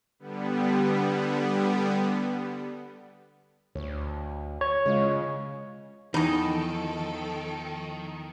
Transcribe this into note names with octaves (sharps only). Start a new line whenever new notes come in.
D3 G3 B3
D2 C#5
C#5
C#3 G#3 F4
E2 D#3 F3 D#4 A4 D#5